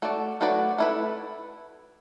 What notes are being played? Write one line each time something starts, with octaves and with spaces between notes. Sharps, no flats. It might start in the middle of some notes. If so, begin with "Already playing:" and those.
A3 F#4 D5
F#3 A3 F#4 B4 D5
A3 E4 B4